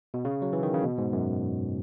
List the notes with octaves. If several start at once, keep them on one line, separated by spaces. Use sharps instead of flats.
B2
C#3
F#3
E3
D#3
C#3
B2
G#2
F#2